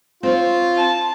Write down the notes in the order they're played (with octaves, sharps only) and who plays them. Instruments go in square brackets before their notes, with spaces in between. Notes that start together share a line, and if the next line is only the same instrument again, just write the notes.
[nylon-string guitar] C4 C5 C#5 [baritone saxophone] F4
[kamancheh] A5